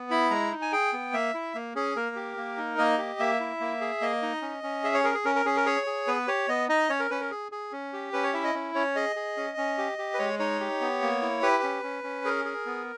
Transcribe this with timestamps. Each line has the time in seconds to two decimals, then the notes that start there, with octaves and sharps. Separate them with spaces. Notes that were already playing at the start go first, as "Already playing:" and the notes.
Already playing: B3
0.10 E4 B5
0.30 G#3 A#5
0.52 D#4
0.62 G#5
0.72 G#4 G5
0.93 B3
1.13 A#3 E5
1.34 E4
1.55 A#3
1.75 C#4 G#4
1.96 A#3 A#4
2.16 G4
2.37 A#3
2.57 D#4
2.78 A#3 D#5
2.98 G4
3.19 A#3 E5
3.40 E4
3.60 A#3
3.81 G#4
4.01 A#3 D#5
4.22 D#4
4.42 C#4
4.63 C#4
4.84 G#4 E5
4.94 C#5
5.04 G#4 A#4
5.14 G#4
5.25 C#4 A#4
5.35 A#4
5.46 C#4 G#4
5.56 A#4
5.66 G#4 C#5
5.87 G#4
6.07 B3 B4
6.27 G4 C#5
6.48 B3 D#5
6.69 D#4 D#5
6.89 C#4 C#5
7.00 A#4
7.10 C#4 B4
7.20 A#4
7.31 G#4
7.52 G#4
7.72 C#4
7.93 G4
8.13 C#4 B4
8.23 C#5
8.33 E4 E5
8.44 D#5
8.54 C#4
8.75 C#4 C#5
8.96 G#4 D#5
9.16 G#4
9.37 C#4
9.57 C#4
9.78 G4
9.98 G4
10.14 B4
10.18 G#3 C#5
10.39 D#4 C#5
10.60 G4
10.81 B3
11.02 A#3
11.22 E4
11.42 G4 B4
11.63 C#4
11.83 C#4
12.04 C#4
12.25 G#4 A#4
12.45 G#4
12.66 B3